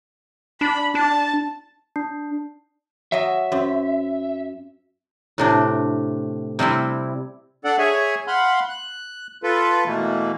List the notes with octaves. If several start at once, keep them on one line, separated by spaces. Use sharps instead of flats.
D4 B5
D4 A5
D4
F#3 D#5 E5
F#2 C4
A2 C3 D4
C3 G3 C4 E4
D4 A4 D5 F#5
G#4 C#5 E5 G#5
F5 F#5 B5 C6
F#6
F4 A4 B4
B2 E3 A3 A#3